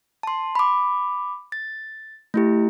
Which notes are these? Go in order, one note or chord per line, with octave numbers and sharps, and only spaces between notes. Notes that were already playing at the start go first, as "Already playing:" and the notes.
A5 C6
B5 D6
A6
A3 E4 G4